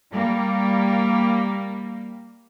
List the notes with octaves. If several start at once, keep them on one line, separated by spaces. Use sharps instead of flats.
G3 A#3